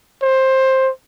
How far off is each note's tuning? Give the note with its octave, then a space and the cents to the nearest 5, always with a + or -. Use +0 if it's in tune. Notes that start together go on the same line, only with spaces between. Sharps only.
C5 +15